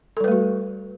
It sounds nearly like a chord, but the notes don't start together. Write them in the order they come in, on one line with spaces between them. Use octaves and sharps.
A4 G3 B4 A3 F#4